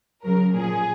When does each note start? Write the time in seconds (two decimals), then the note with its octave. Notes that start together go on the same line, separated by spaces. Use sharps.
0.23 C#3 F#3 A#4
0.54 A#2 F3 G#4